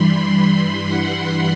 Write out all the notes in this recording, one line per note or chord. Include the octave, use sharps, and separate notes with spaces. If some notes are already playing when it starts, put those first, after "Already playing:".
Already playing: G2 E3 G3 B5 C6
B5
F#5